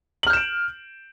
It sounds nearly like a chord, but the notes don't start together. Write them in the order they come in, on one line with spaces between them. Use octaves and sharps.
F#7 F6 G6 E7 D7